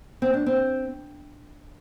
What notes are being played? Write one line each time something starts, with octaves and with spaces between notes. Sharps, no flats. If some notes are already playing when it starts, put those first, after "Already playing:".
C4
D4
C4